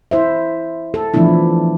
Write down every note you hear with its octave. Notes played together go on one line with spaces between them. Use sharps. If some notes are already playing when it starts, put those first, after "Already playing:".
E4 C5 E5
A4
E3 F3 A3 B3 D4 E4